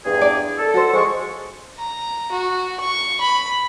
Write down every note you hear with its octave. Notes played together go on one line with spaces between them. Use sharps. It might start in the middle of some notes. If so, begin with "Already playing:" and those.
E2 G2 G#4
D5
A4
F#4 C5
F3 G#3 C5 C#6
A#5
F#4
C#6
B5